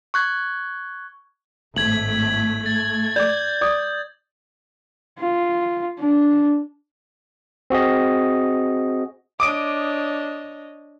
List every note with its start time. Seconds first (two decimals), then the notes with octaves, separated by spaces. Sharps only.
0.14 C#6 F#6 G#6
1.76 G#1 A2 A3 G#6 B6 F#7
2.66 G#6 A6
3.16 D5 D6 G6
3.61 D5 D6 D#6
5.19 F4
6.00 D4
7.70 C4 F#4 G#4 D#5
9.40 D4 C#5 D#5 D6 D#6 D7